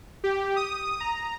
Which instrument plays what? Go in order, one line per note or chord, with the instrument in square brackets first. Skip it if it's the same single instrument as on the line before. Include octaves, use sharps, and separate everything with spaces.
[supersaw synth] G4
D#6
A#5